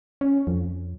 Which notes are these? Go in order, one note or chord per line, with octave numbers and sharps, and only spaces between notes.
C#4
F2